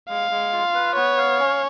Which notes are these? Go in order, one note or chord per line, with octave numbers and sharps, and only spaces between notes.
G#3 F5
G#3
F4
B4
B3 C#5
F5
C#4